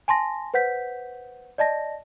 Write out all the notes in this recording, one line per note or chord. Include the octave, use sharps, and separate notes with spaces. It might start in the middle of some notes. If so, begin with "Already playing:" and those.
G#5 A5 C6 A#6
B4 C5 F#5 G6 B6
D5 D#5 A5 A#6